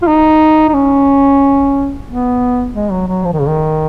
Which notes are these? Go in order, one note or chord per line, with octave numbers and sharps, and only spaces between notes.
F4
D#4
D#4
C#4
B3
G#3
F#3
F#3
F3
D#3
C#3
D#3